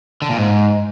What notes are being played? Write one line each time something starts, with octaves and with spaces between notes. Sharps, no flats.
D3
A#2
G#2